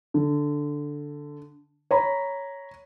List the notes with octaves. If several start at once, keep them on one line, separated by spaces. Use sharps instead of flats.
D3
C#5 A#5 B5